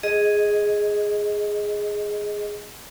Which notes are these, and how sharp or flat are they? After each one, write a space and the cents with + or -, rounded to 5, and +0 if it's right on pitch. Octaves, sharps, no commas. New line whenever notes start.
G#4 +0 D#5 +0